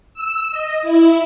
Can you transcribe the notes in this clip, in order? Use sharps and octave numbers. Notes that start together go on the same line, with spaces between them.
E6
D#5
E4